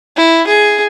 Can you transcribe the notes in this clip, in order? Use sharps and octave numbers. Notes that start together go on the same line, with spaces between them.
E4
G#4